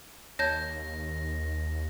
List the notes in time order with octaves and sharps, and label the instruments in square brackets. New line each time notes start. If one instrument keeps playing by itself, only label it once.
[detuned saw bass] D#2 [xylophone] C#5 A5 G6 [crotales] A#6